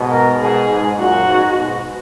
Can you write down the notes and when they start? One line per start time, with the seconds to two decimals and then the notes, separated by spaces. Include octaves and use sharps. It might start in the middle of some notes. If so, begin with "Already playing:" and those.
Already playing: G#2 B2
0.11 A#4
0.40 G#2 B2 G#4
0.69 G#2
0.98 F#2 A#2 F#4
1.27 G#2
1.55 G#2 B2